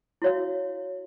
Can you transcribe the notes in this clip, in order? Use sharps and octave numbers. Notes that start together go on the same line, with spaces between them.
E4 F#4 C#5 F5